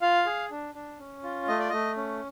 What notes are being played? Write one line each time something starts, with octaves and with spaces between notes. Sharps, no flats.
F4 F5
G#4
D4
D4
C#4
F4
A3 D#5
D5
A3 D#5
C#4